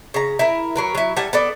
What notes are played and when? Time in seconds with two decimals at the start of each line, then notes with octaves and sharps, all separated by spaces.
0.14 C#3 A#5
0.39 E4 A#4
0.75 F#3 A#4 B4
0.95 F#3 E4
1.16 G3 A4 F#5 G#5
1.33 B3 A4 D5